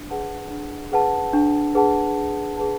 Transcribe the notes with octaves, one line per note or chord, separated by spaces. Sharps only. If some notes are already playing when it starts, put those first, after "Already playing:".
Already playing: D4
G#4 B4 F#5 A5
D4
G#4 B4 F#5 A5
D4
G#4 B4 F#5 A5
D4
G#4 B4 F#5 A5